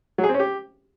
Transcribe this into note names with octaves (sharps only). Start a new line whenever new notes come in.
F#3
G#4
C4
C#4
G4